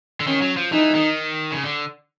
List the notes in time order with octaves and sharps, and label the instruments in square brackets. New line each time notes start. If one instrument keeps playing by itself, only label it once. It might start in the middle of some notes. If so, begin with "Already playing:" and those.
[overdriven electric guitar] D3
[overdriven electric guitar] D#3 [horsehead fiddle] C#4
[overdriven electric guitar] F#3
F3
[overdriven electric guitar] E3 [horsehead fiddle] D#4
[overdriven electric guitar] D#3
C#3
D3